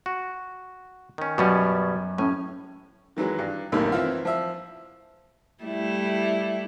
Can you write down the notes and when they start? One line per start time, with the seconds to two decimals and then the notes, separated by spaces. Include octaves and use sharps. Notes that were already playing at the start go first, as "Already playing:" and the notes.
0.06 F#4
1.18 D#3 C#4
1.38 F#2 B2 G3 C#4
2.18 A2 C#4
3.16 D#3 E3 F#3 G#3
3.39 G2
3.72 B1 F#2 A2 C3 D#3 A#3
3.92 E3 C4 E4 F4
4.25 F3 E5
5.64 G3 A3 E4